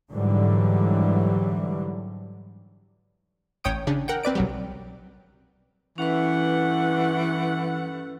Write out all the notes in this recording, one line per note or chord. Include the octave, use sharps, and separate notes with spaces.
G#2 D3 E3 F#3 G3
A1 C#5 G5 D#6 D7
C#3 D4
A#4 F#5 G5
C4 B4 D5 D7
B1 F#3 G3
G2 E3 A3 C#4 B4 F#5